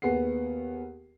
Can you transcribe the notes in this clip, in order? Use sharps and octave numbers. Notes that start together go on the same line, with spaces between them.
D#2 B3 G#4 F#5 C7